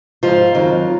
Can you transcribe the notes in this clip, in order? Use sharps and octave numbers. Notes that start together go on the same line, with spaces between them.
G#2 F3 F4
F2 D#3 F#3